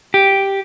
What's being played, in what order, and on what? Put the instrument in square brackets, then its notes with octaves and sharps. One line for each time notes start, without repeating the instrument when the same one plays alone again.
[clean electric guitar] G4